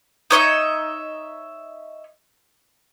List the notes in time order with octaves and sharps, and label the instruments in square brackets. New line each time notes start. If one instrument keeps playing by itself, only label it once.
[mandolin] D#4 C#5 D#5 E5